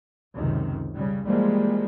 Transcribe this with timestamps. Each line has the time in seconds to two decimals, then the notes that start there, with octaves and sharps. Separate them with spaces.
0.34 C#2 F#2 C3 D#3
0.95 C#3 G3
1.26 E3 F3 G3 G#3 A#3